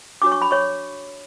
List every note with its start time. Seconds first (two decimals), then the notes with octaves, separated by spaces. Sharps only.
0.22 D4 F#4 C#5 D6
0.32 C#6
0.42 B5
0.51 C#5 C#6